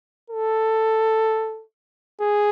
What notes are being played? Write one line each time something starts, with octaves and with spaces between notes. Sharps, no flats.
A4
G#4